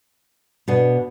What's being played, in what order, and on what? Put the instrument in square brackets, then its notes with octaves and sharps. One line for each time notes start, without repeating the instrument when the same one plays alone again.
[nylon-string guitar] B2 B3 D4